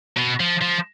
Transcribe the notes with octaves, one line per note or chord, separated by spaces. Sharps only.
B2
F3
F3